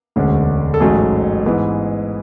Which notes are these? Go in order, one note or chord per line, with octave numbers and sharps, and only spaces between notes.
E1 D2 D3 G#3 C#4
A4
A1 G#2 F#3 A3 C#4 G#4
G#2 E3 B3